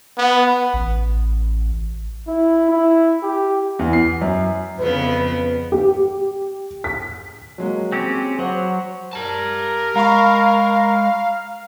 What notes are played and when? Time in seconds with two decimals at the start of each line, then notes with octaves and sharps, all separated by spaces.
0.18 B3
0.73 A1
2.27 E4
2.70 E4
3.23 G4
3.79 E2
3.93 C7
4.21 F#2
4.79 F2 C#3 B3 B4
5.72 G4
6.84 B6
7.58 F#3 G#3 A#3
7.92 C4 C#4 G4
8.39 F#3 C5 F#5
9.13 G4 A#4 A5
9.96 G#3 F5 A#5 B5 C#6